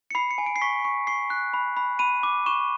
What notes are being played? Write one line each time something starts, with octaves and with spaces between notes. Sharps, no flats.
C#7
B5 C7
C#7
G#5
D7
C7
C#6 B6
C#6
C#6 C7
F#6
B5
B5
B5 D#7
D6
C#6 E7